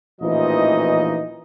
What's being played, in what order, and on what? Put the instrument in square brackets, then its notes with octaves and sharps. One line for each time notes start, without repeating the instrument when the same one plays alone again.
[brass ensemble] A1 A#2 E3 F3 D#4 D#5